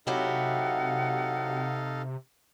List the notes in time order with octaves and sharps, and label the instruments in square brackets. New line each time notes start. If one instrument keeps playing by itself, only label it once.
[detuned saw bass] C3 [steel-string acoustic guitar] F#3 E4 G4 [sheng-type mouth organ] D#4 A4 F5 [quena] F#5